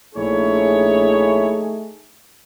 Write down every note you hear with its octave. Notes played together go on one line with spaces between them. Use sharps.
A#1 A3 D#4 E4 G#4 C#5